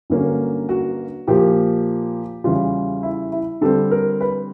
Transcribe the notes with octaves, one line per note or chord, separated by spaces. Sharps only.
G2 D3 F#3 A#3 C#4
F#4
A#2 F3 A#3 G4
E2 C#3 E3 G3 F4
E4
E4
D3 G3 C4 A4
A#4
B4